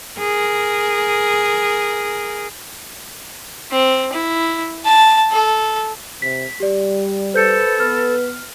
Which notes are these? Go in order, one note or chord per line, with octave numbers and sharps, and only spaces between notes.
G#4 A#4
C4
E4
A5
A4
C3 B6
G3 G4 D5
A4 B4 C5 G6 C#7
B3 B4 F6